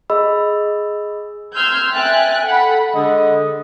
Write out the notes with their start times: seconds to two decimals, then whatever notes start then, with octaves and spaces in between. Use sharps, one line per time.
0.10 G#4 D#5 B5 E6
1.54 C6 E6 F6 G6 G#6
1.92 E5 G5 G#5 F#6 A6
2.45 A4 F#5 B5
2.95 D3 G#3 D#5